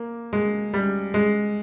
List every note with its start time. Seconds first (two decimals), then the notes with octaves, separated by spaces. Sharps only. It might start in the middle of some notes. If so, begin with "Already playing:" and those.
Already playing: A#3
0.33 G#3
0.74 G3
1.14 G#3